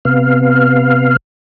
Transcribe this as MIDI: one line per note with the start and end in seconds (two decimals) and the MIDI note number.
0.05 1.16 48
0.05 1.16 59
0.05 1.16 77